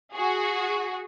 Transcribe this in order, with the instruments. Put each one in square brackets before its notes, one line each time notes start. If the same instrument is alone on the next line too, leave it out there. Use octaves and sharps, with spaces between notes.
[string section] F#4 G#4